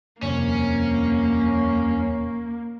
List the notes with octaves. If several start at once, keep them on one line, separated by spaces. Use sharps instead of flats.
D#1 F2 C3 A#3 C#4